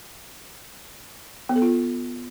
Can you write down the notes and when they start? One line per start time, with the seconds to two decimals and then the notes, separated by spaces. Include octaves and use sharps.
1.49 B3
1.56 A4
1.62 F4